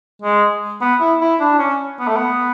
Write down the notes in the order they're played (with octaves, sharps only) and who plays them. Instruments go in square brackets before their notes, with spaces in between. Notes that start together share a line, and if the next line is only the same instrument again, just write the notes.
[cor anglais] G#3
B3
E4
E4
D4
C#4
B3
A3
B3